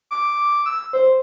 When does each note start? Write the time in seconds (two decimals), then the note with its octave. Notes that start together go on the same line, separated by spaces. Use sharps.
0.11 D6
0.66 E6
0.93 C5